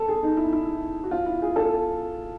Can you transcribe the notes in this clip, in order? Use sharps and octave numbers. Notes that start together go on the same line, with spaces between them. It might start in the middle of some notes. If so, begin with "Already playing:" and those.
Already playing: A4
G#4
D#4
E4
E4
F#4
F4
E4
G#4
A4